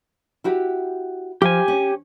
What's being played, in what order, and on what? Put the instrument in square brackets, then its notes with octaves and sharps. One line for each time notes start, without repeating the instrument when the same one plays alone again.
[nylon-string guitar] E4 F#4 G4
[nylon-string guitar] F3 [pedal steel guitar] G4 G#5
[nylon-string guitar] C#4